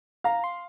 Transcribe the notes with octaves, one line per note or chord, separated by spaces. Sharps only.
F5 A#5
C6